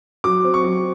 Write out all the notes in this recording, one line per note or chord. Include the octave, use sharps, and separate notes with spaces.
F#3 D6
C4
C#6
F#3